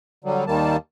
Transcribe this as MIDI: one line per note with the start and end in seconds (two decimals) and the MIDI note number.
0.24 0.44 50
0.24 0.44 54
0.24 0.44 55
0.47 0.77 39
0.47 0.77 51
0.47 0.77 55
0.47 0.77 58
0.47 0.77 81